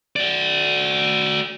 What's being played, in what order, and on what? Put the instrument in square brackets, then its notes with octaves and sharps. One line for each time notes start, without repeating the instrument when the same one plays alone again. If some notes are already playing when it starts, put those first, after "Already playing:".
[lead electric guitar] F#4 D5